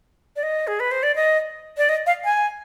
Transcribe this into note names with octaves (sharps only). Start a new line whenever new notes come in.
D5
D#5
G#4
B4
C5
D5
D#5
D5
D#5
F5
G#5